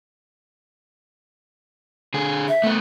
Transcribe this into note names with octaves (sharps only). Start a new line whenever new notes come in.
D3 G#4
E5
A3 B3